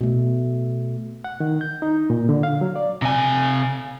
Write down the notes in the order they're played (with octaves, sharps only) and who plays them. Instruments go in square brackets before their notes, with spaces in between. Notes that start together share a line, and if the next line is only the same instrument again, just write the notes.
[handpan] B2 A3
[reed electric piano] F#5
D#3
G6
D#4
A#2
D3
F5
F#3
D5
[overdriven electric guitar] C3 G#5